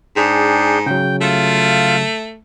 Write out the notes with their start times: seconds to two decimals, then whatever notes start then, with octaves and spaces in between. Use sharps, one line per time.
0.16 G#2 D4 G#4 G5
0.86 C#3 F#3 G5
1.21 A3 F4 F5